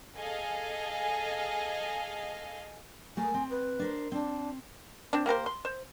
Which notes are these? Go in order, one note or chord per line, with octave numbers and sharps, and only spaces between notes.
G#4 A4 D#5 F5 G#5
A3 A4 A#4 G#5
C4
B4
D4 A#4 C5
C4 D4
C4 D4
A#3 G4 A#4 C5
C6
C5